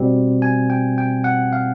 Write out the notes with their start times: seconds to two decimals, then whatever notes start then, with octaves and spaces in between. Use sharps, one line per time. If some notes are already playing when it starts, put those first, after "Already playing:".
Already playing: B2 G3 C4
0.42 G#5
0.70 G5
0.98 G5
1.24 F#5
1.53 F5